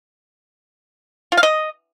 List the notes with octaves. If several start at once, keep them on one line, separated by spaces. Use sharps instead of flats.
F4
F5
D#5